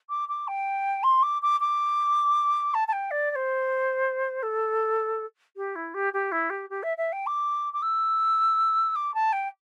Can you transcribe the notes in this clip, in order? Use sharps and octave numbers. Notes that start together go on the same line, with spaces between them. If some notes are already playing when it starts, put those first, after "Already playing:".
D6
D6
G5
C6
D6
D6
D6
A5
A5
G5
D5
D5
C5
A4
G4
E4
G4
G4
E4
G4
G4
E5
E5
G5
D6
D6
E6
D6
A5
G5